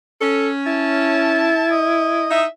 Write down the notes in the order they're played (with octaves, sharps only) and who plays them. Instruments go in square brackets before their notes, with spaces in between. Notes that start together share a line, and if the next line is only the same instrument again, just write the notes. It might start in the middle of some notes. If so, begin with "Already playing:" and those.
[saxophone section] C#4 [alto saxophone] A4
[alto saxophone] E4 [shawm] A5
[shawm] D#5
[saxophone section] D#4 E5